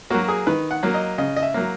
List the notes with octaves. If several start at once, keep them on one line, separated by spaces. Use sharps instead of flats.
F#3 A#3 F#4
G#4
D#3 B4
F#5
F#3 A#3
D#5
C#3 D#5
D#5
E5
F#3 A#3